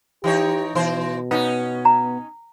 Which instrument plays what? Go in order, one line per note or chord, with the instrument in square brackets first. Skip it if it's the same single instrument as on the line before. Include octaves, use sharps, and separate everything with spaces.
[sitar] E3 D#4 C#5 [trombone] G4
[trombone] B2 [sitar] E3 C5
[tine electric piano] B3 [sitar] C#4 D#4
[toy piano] A#5